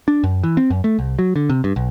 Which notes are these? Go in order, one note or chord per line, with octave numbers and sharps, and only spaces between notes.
D4
F#2
E3
C4
F#2
A3
C2
F#3
D3
C3
G2
B1